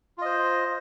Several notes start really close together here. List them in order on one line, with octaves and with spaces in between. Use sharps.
F4 D#5 C5